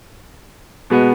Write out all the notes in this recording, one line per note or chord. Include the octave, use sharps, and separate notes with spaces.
B2 G#3 B3